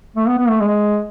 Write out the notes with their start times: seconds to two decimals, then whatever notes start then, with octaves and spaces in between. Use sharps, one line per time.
0.16 A3
0.27 B3
0.38 B3
0.49 A3
0.60 G#3